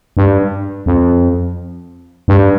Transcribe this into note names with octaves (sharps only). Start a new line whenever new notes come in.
G2
F2
G2